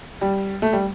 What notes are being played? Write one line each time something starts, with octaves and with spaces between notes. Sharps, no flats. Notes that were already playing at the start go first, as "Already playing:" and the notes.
G3
A3
G3